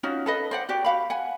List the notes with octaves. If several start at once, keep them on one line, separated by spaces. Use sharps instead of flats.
C#4 D#4 F4 F#4
A4 B4 D#5
C5 D5 F#5
F#4 G4 D5
F#4 F5 B5
F#5 G#5